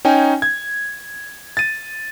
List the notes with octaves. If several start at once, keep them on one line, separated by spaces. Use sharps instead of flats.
C#4 D#4 G5 G#5
G#6
A6 D#7